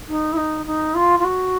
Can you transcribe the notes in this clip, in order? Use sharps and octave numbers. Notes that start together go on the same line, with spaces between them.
D#4
E4
D#4
D#4
F4
F4
F#4